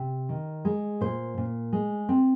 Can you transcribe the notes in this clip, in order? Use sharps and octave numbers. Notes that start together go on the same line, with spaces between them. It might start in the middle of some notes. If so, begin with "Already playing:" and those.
Already playing: C3
D#3
G#3
A#2 C5
A#2
G#3
C4